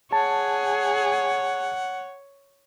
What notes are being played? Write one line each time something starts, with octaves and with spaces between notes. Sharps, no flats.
G#4 C#5 F#5 A5